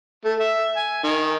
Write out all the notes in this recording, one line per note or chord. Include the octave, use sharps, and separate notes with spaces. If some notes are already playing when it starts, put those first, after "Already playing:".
A3
E5
G#5
D#3